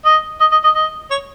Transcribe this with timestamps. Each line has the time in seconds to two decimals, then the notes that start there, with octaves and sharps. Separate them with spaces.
0.05 D#5
0.40 D#5
0.51 D#5
0.64 D#5
0.74 D#5
1.10 C#5